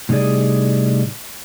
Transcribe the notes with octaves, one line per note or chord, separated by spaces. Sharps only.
A2 C3 G3 D#4 G#4 D5